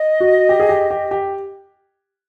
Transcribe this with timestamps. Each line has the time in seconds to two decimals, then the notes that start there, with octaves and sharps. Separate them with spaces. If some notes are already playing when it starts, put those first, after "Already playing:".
Already playing: D#5
0.20 F#4
0.49 G4
0.60 G#4
0.69 G4
0.91 G4
1.11 G4